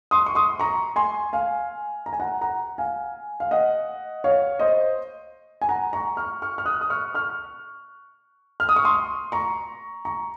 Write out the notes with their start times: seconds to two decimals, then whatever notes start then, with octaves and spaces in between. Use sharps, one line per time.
0.11 C6 D#6
0.26 C#6
0.35 C6 D#6
0.60 A#5 C#6
0.96 G#5 C6
1.33 F5 G#5
2.06 A#5
2.13 G#5
2.20 F#5 A#5
2.41 F#5 A#5
2.78 F5 G#5
3.40 F5
3.51 D#5 F#5
4.24 C#5 F5
4.59 C5 D#5
5.62 G#5
5.69 F#5 A#5
5.93 A#5 C#6
6.17 C#6 F6
6.42 C#6 F6
6.58 F6
6.66 D#6 F#6
6.81 D#6
6.90 C#6 F6
7.14 C#6 F6
8.60 F6
8.69 D#6
8.76 C#6
8.85 C6 D#6
9.32 A#5 C#6
10.05 A#5 C#6